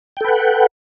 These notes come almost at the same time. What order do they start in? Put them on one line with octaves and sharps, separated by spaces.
G5 A4 B4 F#5